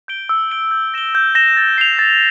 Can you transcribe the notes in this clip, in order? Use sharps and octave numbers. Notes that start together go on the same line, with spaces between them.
G6 D7 G7
E6
G6 D7 G7
G6
A#6 E7 G7
G6
A#6 E7 G7
A6
C7 F7
A6